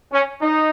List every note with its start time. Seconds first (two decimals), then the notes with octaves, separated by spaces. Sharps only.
0.12 C#4
0.41 D#4